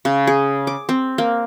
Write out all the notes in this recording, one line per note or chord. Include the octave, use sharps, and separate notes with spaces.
C#3
G#4
D6
C4
A#3